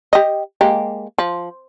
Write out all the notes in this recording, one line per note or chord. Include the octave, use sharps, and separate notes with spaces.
G4 D#5
G#3 A#3 G4
F3